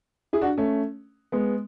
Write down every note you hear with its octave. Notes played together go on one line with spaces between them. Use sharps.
E4 G#4
D4 F#4
A3 C#4
G#3 B3